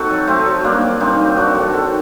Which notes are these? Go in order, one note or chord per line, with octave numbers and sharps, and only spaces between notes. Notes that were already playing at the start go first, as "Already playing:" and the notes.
Already playing: C4 D#4 F#4 A4
F#3
F#3 A3 C4
F#3
G2 A#3 D4
F#3
G2 C4 D#4
F#3
F#3 D4 F#4
F#3 F#4 A4
D#3 F#4 A4